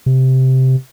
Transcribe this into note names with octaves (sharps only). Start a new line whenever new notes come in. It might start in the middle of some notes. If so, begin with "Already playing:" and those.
C3